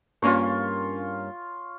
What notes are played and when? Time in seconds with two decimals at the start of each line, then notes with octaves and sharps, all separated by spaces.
0.22 G2 A#3 C#4 F4 C#5